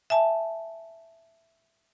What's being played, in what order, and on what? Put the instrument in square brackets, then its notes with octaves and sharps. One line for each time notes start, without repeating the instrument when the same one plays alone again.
[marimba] E5 G#5 A5